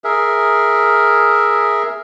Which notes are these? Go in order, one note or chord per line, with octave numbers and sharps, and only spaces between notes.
G#4 A#4 E5